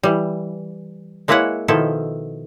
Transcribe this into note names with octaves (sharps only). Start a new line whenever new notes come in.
E3 G3
G#3 A#3 E4 B4 C#5 F#5
B2 D#3 F3 E4 A4